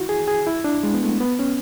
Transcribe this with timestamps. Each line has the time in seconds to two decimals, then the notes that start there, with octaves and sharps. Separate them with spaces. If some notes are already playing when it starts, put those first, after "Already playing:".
Already playing: E4 F#4
0.09 G#4
0.28 G#4
0.47 E4
0.64 D4
0.83 G#3
0.94 B3
1.03 A3
1.20 B3
1.39 C#4